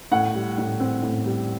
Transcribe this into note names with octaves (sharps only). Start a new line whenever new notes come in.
A2 F#5
G3
A2
C4
A2
G3